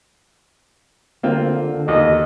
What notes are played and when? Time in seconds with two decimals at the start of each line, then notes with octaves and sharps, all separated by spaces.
1.23 D3 A#3 C4 F4
1.88 D#2 D#5